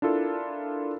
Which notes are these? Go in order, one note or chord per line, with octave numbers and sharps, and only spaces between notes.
D4 E4 F4 A4 A#4